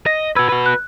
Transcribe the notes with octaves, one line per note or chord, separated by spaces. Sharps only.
D#5 A#6
F#4 B4 E6 G#6
F#4 B4
F#6